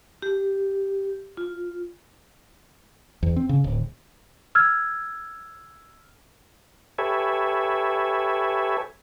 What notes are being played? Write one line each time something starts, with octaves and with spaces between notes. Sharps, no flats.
G4
F4
E2
C4
C#3
D1
E6 F6 G#6
G4 A4 B4 C#5 E5 G#5